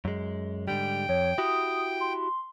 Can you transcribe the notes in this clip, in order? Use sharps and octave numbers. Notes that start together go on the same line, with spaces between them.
F#2 G#3
G#2 D3 G3 G5
F2 C#5
E4 F#4 G4 D#6
C6